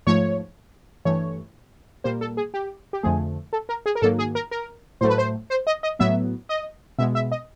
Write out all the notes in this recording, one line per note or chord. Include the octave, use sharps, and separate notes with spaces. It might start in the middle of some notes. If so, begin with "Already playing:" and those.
G#2 F3 A3 C#5
G2 E3 A3 C#5
A#2 G3 A#3 C5
A4
G#4
G4
G4
F2 D3 F3 A3 G#4
A4
A#4
G#4
A#4
G#2 D#3 F#3 A#3 A4
G#4
A#4
A#4
A2 F#3 A3 C5
B4
C5
C5
D#5
D#5
A2 F#3 B3 E5
D#5
B2 G#3 B3 E5
E5
D#5